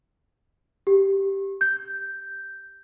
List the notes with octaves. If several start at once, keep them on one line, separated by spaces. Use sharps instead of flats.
G4
G6